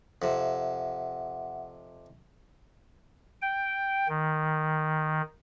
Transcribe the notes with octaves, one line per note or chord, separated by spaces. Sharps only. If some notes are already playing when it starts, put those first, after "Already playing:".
F2 C3 E5 F#5
G5
D#3